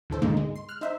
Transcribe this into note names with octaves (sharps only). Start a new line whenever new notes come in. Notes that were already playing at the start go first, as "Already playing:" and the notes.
D2 A2 A4 C5
G#2 B2 D3 G#3 A#3 D#4
G#3
C6
F6 F#6
D#4 C5 E5